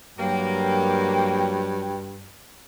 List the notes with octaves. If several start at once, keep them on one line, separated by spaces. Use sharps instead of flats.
G2 F#3 A#3 G5